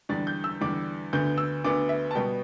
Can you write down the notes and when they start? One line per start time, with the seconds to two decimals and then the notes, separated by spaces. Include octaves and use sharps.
0.09 E2 D3 G3 D4 A6
0.27 G6
0.44 E6
0.61 E2 D3 G3 D4 D6
1.13 D2 D3 B3 G6
1.38 E6
1.64 D2 D3 B3 D6
1.89 E5
2.11 A5
2.15 B2 G3 B3 G5